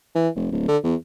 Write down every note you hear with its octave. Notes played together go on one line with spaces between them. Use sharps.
E3
F1
D1
D3
E2